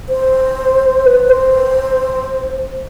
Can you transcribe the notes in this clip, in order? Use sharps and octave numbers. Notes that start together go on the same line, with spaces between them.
C5
B4
C5